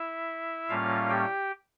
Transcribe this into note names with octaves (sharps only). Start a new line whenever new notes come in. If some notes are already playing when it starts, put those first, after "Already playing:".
Already playing: E4 E5
A2 G3 A#3 C#4 F4 F5
G4 G5